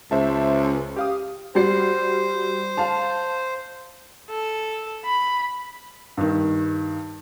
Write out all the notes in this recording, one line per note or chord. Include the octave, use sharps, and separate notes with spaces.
C#2 C5 E5 A5
G4 F5 D#6
G3 F#4 C5 C7
F5 A5
A4
B5
G2 D#3